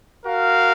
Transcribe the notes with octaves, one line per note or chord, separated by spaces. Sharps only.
F#4 A#4 F5